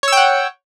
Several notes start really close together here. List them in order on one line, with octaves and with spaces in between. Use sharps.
C#5 E6 G5 F#5